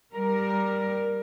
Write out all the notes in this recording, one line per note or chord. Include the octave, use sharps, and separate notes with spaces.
G3 A#4